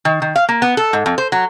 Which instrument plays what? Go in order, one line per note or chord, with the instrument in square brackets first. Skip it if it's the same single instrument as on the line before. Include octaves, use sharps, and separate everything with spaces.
[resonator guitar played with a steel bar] D#3
D#3
F5
A#3
B3
A4
G#2
F2
C5
F#3